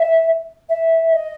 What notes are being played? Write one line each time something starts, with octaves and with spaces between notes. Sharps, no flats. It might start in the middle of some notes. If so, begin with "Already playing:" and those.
Already playing: E5
E5
D#5